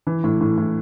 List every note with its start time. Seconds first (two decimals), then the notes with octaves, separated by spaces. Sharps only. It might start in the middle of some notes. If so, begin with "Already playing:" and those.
0.07 E3
0.24 A2
0.41 A2
0.58 A2